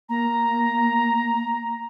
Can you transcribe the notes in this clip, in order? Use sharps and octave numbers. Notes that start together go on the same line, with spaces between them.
A#3 A#5